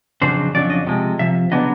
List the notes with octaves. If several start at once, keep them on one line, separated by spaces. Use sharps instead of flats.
F2 C#3 F#3 D4 C5
F2 C#3 F#3 D4 D5
D#5
C3 F3 G#3
C3 F3 E5
C#3 F#3 B3 D4 D#5